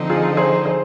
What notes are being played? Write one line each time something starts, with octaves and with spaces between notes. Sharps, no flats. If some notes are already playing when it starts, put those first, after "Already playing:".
Already playing: D3 F3 C4 D#4
F4 G#4
G#4 C5
G#4 C5